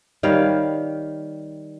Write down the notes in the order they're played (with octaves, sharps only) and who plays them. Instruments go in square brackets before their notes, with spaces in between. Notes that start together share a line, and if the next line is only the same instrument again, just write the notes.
[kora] D#3 G3 C#5 F5